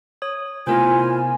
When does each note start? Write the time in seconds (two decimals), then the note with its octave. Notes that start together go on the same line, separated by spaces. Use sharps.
0.22 C#5 D#6
0.67 C3 A3 B3 E4 F4 A#4 C5 G#5